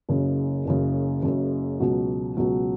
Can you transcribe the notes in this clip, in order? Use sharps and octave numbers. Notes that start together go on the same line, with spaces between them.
F#1 F#2 C#3
F#1 F#2 C#3
F#1 F#2 C#3
C#2 B2 F#3
C#2 B2 F#3